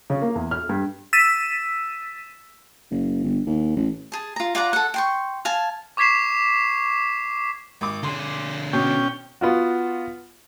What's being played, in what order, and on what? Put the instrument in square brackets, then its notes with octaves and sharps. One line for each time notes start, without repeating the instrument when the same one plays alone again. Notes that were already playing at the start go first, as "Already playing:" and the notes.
[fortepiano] C#3
A#3
E2
F6
G2
[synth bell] E6 A6 B6 D#7 E7
[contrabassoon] F#1
G1
D#2
A1
[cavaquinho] G#4 A5
F4 A#5
F4 D5 F#5 A#5
A4 F#5
G5 C6 C#6
F5 G#5 A5
[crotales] C#6 D6 G#6 B6 C7 E7
[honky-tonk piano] G#1 D6
[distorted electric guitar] D3 G#4 [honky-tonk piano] C6
[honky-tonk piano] B2 [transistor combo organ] C#4 G5
[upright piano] B3 F4 F#4